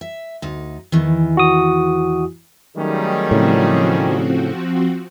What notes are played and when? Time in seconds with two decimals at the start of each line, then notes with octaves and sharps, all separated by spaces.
0.01 E5
0.42 D2 D#4
0.92 E2 D#3 E3
1.37 F#4 D#6
2.77 D#3 F#3 G3 A3 C#4 G#4
3.31 A2 C#3 F3 C4 F#4